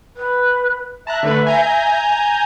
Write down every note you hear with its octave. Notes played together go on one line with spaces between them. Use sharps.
B4
E5 A5 A#5 F#6
D3 A3 B4
G#5 A#5 G6